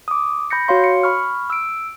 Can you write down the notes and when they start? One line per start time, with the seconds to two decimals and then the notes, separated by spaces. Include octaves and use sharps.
0.08 D6 D#6
0.50 B5 G6 A#6 C#7
0.68 F#4 C#5 F5 C6
0.84 C#7
1.03 B5 C#6 F6
1.50 E6 D7